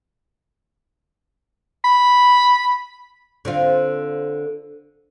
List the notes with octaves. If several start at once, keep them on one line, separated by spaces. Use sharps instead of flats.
B5
D3 C4 F4